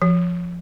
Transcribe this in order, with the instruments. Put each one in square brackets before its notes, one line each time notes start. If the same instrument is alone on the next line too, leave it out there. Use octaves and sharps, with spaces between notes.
[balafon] F3